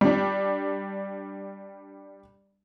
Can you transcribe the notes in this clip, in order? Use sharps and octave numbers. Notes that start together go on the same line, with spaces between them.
G3 D4